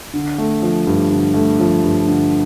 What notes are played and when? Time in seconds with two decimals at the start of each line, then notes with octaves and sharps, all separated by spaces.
0.14 D3
0.38 A3
0.62 F3
0.87 G2
1.10 D3
1.34 A3
1.59 F3
1.84 G2
2.07 D3